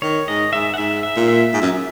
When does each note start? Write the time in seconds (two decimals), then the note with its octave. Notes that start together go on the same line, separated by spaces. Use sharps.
0.02 D#3 C#5
0.28 G#2 D#5
0.53 G#2 E5
0.74 F#5
0.78 G#2 E5
1.03 E5
1.16 A#2
1.28 E5
1.54 G#2
1.62 F#2